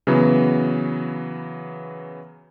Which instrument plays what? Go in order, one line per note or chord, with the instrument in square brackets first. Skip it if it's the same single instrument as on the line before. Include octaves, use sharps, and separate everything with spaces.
[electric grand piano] C#3 E3 F#3 B3